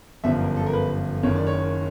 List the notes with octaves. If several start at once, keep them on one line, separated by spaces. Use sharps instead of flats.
G1 F#2 D3 F3 E5
A#4
A4
A#4
B4
F#1 F#2 D#3 C#5
D5
C#5